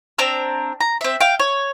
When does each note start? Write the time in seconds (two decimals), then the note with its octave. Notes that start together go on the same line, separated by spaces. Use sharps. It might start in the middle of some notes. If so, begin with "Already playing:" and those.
0.18 C4 D4 A#5 E6
0.81 A#5
1.01 C4 E5
1.21 F5 G5
1.39 C#5